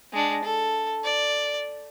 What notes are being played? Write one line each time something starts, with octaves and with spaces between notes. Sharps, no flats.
G#3 D4
A4
D5